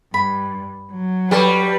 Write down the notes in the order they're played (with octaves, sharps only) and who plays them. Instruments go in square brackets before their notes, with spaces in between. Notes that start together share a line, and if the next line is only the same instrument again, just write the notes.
[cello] G2 [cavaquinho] B5
[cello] F#3
[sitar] G3 [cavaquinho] A4 C#5 D5 [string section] B4